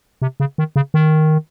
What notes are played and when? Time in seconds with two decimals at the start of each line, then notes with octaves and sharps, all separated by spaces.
0.22 C3
0.40 C#3
0.58 D#3
0.76 C#3
0.94 D#3